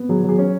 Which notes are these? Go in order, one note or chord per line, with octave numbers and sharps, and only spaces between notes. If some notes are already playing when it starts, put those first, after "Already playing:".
Already playing: B3
F#3 G#4
F#3 G#4
C#4